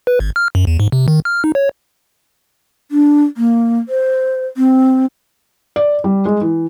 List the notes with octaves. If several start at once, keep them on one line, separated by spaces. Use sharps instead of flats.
B4
G#1
F6
F#2
E2
G#2
C3
D#3
F6
D#4
C#5
D4
A#3
C5
C4
D5
G3
G#3
E3